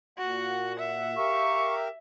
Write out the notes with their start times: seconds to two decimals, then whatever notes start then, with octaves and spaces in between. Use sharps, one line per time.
0.19 A#2 F#4 F#5
0.79 E5
1.16 G4 A#4 F5 C#6